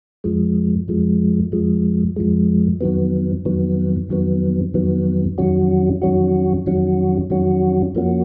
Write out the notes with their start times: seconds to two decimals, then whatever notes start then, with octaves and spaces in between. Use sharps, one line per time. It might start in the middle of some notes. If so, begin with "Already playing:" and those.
0.24 F2 F3 G#3
0.88 F2 F3 G#3
1.52 F2 F3 G#3
2.16 F2 F3 G#3
2.81 F2 D#3 F#3 B3
3.45 F2 D#3 F#3 B3
4.09 F2 D#3 F#3 B3
4.74 F2 D#3 F#3 B3
5.38 F2 D#3 F#3 C#4 F#4
6.02 F2 D#3 F#3 C#4 F#4
6.66 F2 D#3 F#3 C#4 F#4
7.30 F2 D#3 F#3 C#4 F#4
7.95 F2 F3 A#3 C#4 F#4